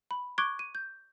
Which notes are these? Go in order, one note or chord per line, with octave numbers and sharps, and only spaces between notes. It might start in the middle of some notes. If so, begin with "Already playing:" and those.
B5
C#6 D6 F#6 G#6 D7 G7
D#7
G6